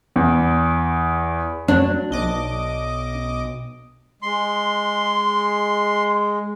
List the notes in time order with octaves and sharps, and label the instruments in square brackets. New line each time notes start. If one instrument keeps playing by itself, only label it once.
[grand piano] E2
[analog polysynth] F#3 [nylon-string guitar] D4
[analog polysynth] B1 D#5 D6
[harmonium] G#3 [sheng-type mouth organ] C6